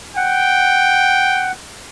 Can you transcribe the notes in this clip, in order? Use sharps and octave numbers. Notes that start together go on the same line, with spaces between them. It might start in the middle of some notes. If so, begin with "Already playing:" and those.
F#5 G5